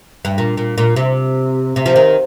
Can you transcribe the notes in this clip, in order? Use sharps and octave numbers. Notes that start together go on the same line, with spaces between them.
G2
A#2
A#2
A#2
C3
C3
F3
D#3